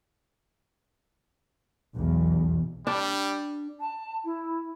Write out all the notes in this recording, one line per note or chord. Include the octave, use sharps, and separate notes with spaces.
B1 E2
G3 D4
A5
E4